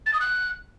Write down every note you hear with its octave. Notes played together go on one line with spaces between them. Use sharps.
A6
D#6
F#6